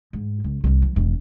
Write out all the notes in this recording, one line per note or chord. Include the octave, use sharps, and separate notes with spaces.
G#2
C#2
C2 D#3
F3
E1 D#3